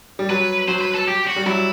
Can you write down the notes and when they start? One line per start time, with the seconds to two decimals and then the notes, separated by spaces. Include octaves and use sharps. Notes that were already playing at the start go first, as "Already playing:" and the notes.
0.19 G3
0.29 F#3 B4
0.68 F#3 C5
0.81 B4
0.95 A4
1.08 G4
1.27 F#4
1.36 G3
1.46 F#3 E4